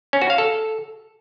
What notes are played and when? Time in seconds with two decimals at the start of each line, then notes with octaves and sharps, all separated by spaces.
0.13 C#4
0.22 F#4
0.30 F5
0.38 A4